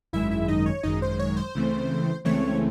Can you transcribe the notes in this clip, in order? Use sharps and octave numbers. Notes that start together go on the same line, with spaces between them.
G#1 F#2 D#3 G#3 E4 E5
E4 E5
D#4 D#5
C#5
G#1 F#2 D#3 G#3 D#4 D#5
C5
C#5
C5
C#2 C#3 E3 A3 C4
C#2 C#3 E3 A3 C4 C#5